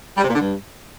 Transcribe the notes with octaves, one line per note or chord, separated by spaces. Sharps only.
G3
C3
A#2
D3
G2